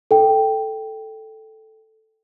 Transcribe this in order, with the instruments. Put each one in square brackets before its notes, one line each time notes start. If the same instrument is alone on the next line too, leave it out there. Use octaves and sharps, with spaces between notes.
[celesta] A4 G5